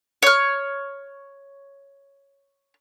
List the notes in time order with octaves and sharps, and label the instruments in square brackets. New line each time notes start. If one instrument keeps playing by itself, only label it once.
[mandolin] C#5 F6